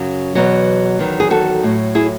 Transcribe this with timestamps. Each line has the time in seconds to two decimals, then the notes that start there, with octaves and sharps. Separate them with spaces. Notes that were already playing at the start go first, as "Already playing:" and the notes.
Already playing: F#2 C#3 F#3
0.35 E2 B2 F#3
0.99 E2 D#3 F#3
1.20 G#4
1.31 F#4 A4
1.63 A2 F#3
1.95 E4 G#4